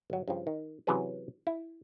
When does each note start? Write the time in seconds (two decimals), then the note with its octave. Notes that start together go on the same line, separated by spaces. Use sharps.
0.10 G1 F#3
0.28 G2 C#3 F3
0.47 D#3
0.87 C3 E3 F#3 C#4 G#4 B4
1.47 E4